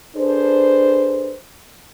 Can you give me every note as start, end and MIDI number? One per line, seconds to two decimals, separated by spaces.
0.16 1.35 62
0.16 1.35 68
0.16 1.35 69
0.16 1.35 71
0.16 1.35 72